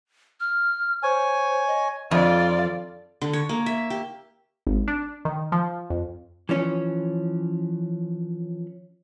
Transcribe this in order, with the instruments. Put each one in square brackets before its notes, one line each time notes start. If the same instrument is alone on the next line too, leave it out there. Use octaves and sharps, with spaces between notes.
[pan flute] F6
[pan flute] C5 [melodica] C#5 G#5
[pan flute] D#5
[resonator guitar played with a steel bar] F2 [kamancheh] F4 D5
[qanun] D3
C#5
A#3
E5
G4
[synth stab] G#1
D4
D#3
F3
F2
[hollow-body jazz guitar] E3 F3 C#4 C#5